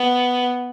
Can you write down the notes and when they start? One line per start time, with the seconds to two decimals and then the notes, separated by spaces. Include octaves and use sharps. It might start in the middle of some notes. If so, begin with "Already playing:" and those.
Already playing: B3